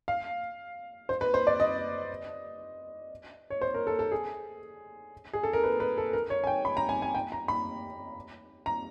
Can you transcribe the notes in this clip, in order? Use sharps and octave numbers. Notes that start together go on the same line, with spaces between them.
F5
C5
B4
C5
D5
D#5
C#5
C5
A#4
A4
A4
G#4
G#4
A4
A#4
B4
B4
A4
A#4
C#5
G#5
G5
B5
A#5
G#5
G#5
G5
A#5
B5
A#5